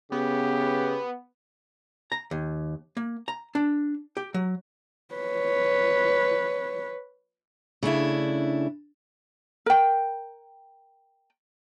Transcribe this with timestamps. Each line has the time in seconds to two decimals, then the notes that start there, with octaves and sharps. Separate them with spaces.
0.12 C#3 B3 G4
2.12 A#5
2.31 D#2
2.97 A#3
3.28 A#5
3.55 D4
4.17 G4
4.34 F#3
5.15 B4 C#5
7.83 C#3 A3 D4 E4
9.66 A#4 G5